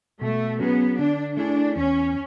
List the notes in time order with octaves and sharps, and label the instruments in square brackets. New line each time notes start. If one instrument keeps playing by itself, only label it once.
[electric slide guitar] B2 [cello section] A3
[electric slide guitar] F#3 C#4 G#4 [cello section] B3
[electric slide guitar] D3 [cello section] D4
[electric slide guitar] A3 E4 G#4 [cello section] D4
[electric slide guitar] E2 [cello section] C#4